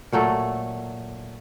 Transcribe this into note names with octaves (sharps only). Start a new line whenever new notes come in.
A#2 F#3 A3 A4